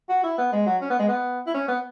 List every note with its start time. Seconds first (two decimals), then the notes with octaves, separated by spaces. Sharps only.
0.09 F#4
0.24 E4
0.38 B3
0.52 G#3
0.66 F#3
0.82 C#4
0.90 B3
0.99 G#3
1.08 B3
1.47 E4
1.54 C#4
1.68 B3